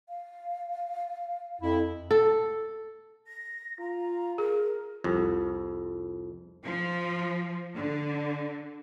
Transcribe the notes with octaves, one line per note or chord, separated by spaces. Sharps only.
F5
F2 E4
A4
A#6
F4 A#5
G#4 A#4
C2 F2
F3
D3